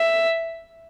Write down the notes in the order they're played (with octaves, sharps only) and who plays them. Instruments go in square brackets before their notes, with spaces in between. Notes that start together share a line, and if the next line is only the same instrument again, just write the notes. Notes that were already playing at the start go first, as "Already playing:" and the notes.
Already playing: [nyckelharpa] E5